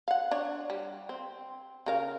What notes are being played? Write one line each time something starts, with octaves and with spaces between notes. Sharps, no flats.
F5 F#5
D4 C#5
G3
C4
C#3 A#4 F5